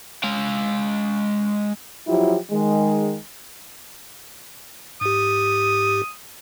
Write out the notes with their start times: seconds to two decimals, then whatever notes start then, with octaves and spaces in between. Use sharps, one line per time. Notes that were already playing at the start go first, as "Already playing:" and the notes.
0.23 G#3 F5
2.07 F3 F#3 E4 F4 G4
2.50 D#3 G#3
5.01 G#2 G4 D#6